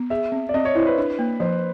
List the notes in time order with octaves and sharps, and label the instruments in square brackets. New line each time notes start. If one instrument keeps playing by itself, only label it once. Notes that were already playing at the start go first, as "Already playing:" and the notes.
Already playing: [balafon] B3
[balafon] G#4 [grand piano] E5
[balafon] C4
[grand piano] D5
[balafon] C4 [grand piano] D#5
[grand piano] C#5
[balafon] E4 [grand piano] C5
[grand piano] B4
[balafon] D4
A#3
[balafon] F3 [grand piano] C5